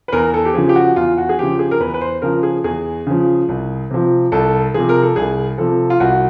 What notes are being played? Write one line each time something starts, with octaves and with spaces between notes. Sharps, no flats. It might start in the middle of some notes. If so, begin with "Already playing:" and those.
B4
E2 A#4
A4
G4
C#3 F3 G#4
G4
F#4
E2 F4
F#4
G#4
C#3 F3 G4
G#4
A#4
E2 B4
B4
C5
C#3 F3 A#4
G#4
E2 G#4
C#3 F3
C2
C3 F3
C2 A4
C3 F3 G#4
A#4
A4
C2 G#4
C3 F3 A4
F4
C2 F#4